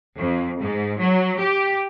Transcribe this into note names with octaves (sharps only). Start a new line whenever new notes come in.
F2
G#2
F#3
G4